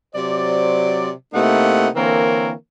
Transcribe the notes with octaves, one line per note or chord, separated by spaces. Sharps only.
C3 F#3 C5 D5
C3 A3 A#3 D#4 E4 F#5
D3 E3 A#3 C4 A#4 C#5